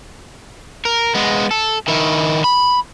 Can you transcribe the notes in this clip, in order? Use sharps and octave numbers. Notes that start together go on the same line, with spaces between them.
A#4
G#3 B3
A4
D#3 E4
B5